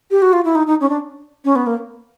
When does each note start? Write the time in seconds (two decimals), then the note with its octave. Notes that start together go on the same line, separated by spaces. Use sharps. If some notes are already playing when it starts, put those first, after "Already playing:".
0.11 G4
0.22 F#4
0.33 F4
0.44 E4
0.55 D#4
0.67 D#4
0.81 C#4
0.89 D4
1.45 C#4
1.56 B3
1.67 A#3